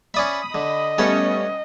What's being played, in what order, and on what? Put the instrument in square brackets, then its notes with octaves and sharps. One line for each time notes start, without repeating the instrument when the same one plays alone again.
[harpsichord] C#4 D5 E5 [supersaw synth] B5 D#6
[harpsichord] D3 [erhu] D#5
[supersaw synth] G3 B3 C#4 [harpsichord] A3 A4 C#5